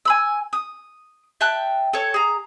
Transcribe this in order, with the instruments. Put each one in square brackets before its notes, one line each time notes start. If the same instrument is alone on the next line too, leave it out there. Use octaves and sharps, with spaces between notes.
[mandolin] G#5 B5 E6
D#6
E5 G5 A5 F#6
A4 C#5
G#4 A#5